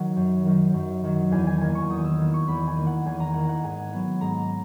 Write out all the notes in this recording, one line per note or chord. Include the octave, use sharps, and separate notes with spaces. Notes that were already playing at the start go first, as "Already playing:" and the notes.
Already playing: D#3 F#3 F#5
F#2
D#3 F#3
F#2
D#3 F#3
E2 G#5
G#5
D#3 A#3 G#5
C#6
E2 D#6
E6
D#3 A#3 E6
C#6
E2 B5
G#5
D#3 A#3
F#5
E2 G#5
A#5
D#3 A#3 F#5
F#5
G#2 G#5
F#3 B3
G#2 A#5